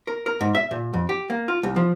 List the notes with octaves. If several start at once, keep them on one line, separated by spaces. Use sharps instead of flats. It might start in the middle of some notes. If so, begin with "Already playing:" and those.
A#4
A#4
G#2
E5
A#2
F2
G4
A#3
F4
C2
F3